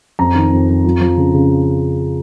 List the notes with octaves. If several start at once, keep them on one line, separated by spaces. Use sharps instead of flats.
F2 A#5
D#3
F2
F2
F3
F3
C#3
C#3